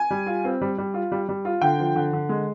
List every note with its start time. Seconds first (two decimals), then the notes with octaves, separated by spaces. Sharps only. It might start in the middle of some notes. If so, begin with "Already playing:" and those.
Already playing: G#5
0.11 G3
0.27 F4
0.45 C4
0.61 G3
0.78 G3
0.94 F4
1.12 G3
1.29 G3
1.45 F4
1.61 D3 G5
1.79 F3
1.96 D3
2.13 D3
2.29 G#3